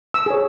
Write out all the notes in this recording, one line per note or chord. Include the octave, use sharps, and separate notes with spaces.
E6
G#4 C#5